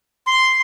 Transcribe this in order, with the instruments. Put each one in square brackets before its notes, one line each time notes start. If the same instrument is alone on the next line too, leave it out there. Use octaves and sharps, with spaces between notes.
[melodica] C6